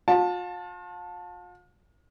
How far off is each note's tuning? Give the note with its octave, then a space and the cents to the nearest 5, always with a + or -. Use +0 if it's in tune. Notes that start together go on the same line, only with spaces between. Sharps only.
F4 +40 A5 +0